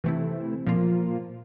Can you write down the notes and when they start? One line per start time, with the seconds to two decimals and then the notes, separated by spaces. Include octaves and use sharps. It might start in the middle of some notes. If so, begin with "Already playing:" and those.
0.04 C3 E3 A3 C4 E4
0.67 A#2 F3 A#3 F4